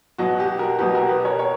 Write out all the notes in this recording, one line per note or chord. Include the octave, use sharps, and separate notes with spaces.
E2 B2 F#3 F#4
G4
F#4 A#4
E2 B2 F#3 G4 B4
F#4 A#4
G4 B4
A#4 C#5
A#4 C#5